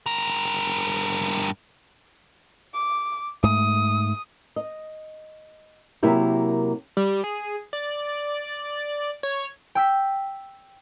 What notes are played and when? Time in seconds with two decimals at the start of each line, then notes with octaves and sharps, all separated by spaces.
0.06 G2 A#4
2.74 D6
3.43 G#2 A3 D#6
4.56 D#5
6.03 C3 F#3 A#3 E4 G4 A#4
6.97 G3
7.24 G#4
7.73 D5
9.23 C#5
9.75 G5 E6 B6